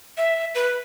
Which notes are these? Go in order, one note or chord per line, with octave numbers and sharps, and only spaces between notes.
E5
B4